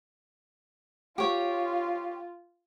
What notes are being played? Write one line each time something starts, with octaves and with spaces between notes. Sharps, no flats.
F4 G4 C#5